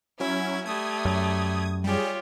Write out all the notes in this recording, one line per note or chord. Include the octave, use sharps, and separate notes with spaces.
F#3 C#4 E4 G#6
G3 A3 D#6 G#6
F#2
G3 F4 G4 G#4 C#5